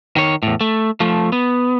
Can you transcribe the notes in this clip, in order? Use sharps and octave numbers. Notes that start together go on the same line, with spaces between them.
D#3 C#5
E2 A2
A3
F3 A3
B3